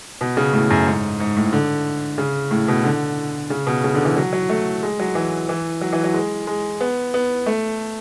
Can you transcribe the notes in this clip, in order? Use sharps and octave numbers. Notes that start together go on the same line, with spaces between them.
B2
C#3
A2
F#2
G#2
G#2
A2
D3
C#3
A2
B2
D3
C#3
B2
C#3
D3
E3
F#3
F#3
A3
G#3
F#3
E3
E3
F#3
E3
F#3
G#3
G#3
B3
B3
A3